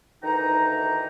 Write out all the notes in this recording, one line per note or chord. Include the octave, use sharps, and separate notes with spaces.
D2 D#3 E3 D#4 G5 A#5